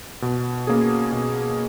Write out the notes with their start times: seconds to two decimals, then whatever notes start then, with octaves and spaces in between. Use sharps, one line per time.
0.22 B2
0.67 A#3 C#4 G#4
1.12 B2